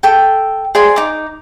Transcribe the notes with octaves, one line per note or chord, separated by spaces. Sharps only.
A4 G5
G#4 C5 D5 C6
D#4 D6